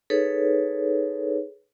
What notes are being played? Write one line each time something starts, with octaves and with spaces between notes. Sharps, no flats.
D#4 G#4 A4 B4 C#5